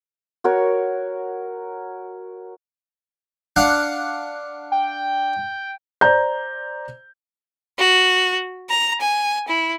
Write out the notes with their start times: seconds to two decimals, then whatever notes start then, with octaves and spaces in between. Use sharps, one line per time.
0.44 F#4 A#4 C#5
3.56 D4 F5 F#5
4.72 G5
6.01 C5 D5 A#5 G6
7.79 F#4
8.69 A#5
9.01 G#5
9.48 E4